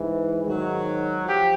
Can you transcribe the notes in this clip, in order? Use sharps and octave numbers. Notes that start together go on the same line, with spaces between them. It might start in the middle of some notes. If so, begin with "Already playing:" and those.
Already playing: G#2 E3
G#2 D#3 F#3
F3 G4